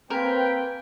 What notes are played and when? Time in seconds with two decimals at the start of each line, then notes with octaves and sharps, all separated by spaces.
0.10 A#3 C4 A#4 B4 G5 G#5